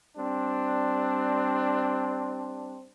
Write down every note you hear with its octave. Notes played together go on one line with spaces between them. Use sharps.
G3 C4 D4